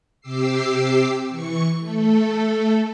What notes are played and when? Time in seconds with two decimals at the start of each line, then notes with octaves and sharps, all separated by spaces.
0.21 C3 G4 D6 E6 C7
1.30 E3 C#6 C#7
1.80 A3 A4